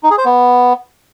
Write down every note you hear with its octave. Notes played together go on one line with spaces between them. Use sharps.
D#4
G#4
C5
B3